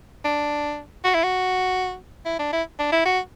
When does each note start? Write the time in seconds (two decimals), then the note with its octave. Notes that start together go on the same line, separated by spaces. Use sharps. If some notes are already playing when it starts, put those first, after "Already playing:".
0.25 D4
1.05 F#4
1.14 E4
1.23 F#4
2.25 E4
2.39 D4
2.53 E4
2.79 D4
2.92 E4
3.05 F#4